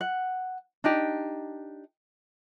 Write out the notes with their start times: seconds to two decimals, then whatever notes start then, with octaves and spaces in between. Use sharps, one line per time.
0.01 F#5
0.84 D4 D#4 G4